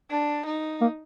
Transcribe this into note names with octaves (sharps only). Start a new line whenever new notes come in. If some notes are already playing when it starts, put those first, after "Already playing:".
D4
D#4
A#3